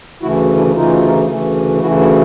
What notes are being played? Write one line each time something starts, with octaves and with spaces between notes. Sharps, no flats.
D2 C#3 E3 A3 E4 F#4
D4 E4
D2 C#3 E3 A3 D#4 F4
D2 C#3 E3 A3
D2 C#3 E3 A3 E4 F#4
E4 F#4